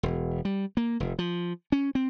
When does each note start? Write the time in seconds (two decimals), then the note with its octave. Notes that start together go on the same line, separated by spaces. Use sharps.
0.03 E1
0.45 G3
0.77 A#3
1.00 F1
1.19 F3
1.72 C#4
1.95 C4